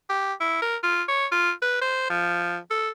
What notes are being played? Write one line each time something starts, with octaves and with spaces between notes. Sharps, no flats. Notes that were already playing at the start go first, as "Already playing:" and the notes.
G4
E4
A#4
F4
C#5
F4
B4
C5
F3
A4